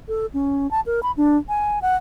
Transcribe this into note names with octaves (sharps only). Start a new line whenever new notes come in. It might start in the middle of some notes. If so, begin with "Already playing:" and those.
A4
C#4
A5
A#4
B5
D4
G#5
F#5